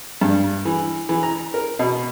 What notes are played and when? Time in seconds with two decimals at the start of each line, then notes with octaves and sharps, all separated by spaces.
0.21 G2
0.65 E3
1.09 E3
1.23 A#5
1.54 A#4
1.79 B2